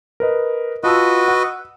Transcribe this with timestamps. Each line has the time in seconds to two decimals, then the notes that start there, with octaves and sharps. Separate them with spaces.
0.20 A#4 B4 D#5
0.84 F4 F#4 B4 D#5 A5 E6
1.28 F#5